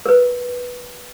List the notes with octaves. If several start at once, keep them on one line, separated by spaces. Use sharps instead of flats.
A#4 B4